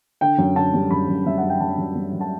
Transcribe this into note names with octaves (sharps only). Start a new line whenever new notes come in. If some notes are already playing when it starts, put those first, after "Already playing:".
D3 G5
F#2
D3 A5
G3
F#2 B5
F#2
G3 E5
F#5
F#2
G5
F#2 A5
F#2
G3
F#2
A5